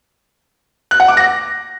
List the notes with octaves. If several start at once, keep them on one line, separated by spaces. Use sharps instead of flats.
F#6
F#5
D6
A#6